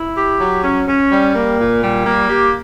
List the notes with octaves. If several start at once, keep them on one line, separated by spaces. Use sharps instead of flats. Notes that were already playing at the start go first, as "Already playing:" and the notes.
Already playing: E4
G4
F#3
C#4
C#4
G3
A#3
A#2
G3
A#3
G4